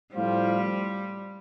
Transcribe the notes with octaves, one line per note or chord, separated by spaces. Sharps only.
A2 F3 G3 C4 F4 C5